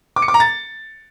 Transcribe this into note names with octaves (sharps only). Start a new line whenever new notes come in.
D6
C#7
D6
A#5
A6